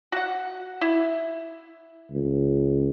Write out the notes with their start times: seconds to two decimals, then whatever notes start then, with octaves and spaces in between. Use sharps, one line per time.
0.12 F#4 F#5
0.81 E4
2.11 C#2